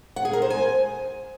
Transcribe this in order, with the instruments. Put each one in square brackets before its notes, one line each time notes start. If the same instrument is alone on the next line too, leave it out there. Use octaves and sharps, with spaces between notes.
[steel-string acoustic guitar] F#5
G#4
A#4
C5
G#5